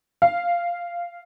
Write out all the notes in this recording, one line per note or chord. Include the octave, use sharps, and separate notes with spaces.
F5